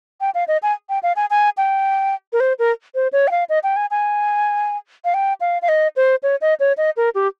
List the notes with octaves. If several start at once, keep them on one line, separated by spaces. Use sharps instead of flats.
G5
F5
D#5
G#5
G5
F5
G#5
G#5
G5
A#4
C5
A#4
C5
C#5
G5
F5
D#5
G5
G#5
G#5
F5
G5
F5
F5
D#5
C5
C#5
D#5
C#5
D#5
A#4
G4